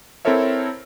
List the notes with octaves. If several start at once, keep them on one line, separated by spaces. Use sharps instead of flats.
C4 E4 A4 A#4 C#5 E5